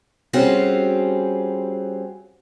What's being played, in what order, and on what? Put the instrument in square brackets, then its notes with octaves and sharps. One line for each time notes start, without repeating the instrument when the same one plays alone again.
[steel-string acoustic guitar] G3 C4 C#4 F4 F#4 G#4